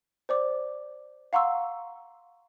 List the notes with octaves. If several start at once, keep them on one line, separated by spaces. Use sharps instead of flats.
C5 D5 D6
F5 F#5 A#5 C6 C#6 E6